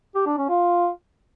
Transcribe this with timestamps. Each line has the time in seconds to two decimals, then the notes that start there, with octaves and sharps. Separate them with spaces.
0.15 G4
0.26 D4
0.38 C#4
0.49 F4